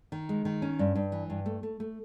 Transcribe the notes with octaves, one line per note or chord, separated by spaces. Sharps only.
D#3
G#3
D#3
C#4
G2
G2
E3
G2
A3
A3
A3